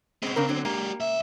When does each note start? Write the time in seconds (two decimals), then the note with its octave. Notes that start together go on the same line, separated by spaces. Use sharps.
0.23 B2 G#3 B3 C4
0.36 C#3 D4 A#4
0.49 D3 F#3
0.65 G#3 A#3 G4
1.00 C#2 E5